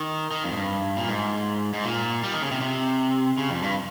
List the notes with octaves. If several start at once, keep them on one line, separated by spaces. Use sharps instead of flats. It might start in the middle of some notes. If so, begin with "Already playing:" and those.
Already playing: D#3
D#3
F2
G#2
G2
A#2
G#2
G#2
A#2
G3
D#3
C#3
C3
C3
C#3
F2
G2